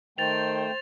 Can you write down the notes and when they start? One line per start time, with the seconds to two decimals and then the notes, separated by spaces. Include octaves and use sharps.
0.18 D#3 A3 C5 G5 A6 F7